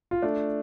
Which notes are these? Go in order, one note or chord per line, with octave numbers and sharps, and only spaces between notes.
F4
A3 D4